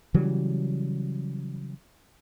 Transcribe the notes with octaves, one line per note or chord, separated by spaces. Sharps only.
C#3 E3 F#3 G3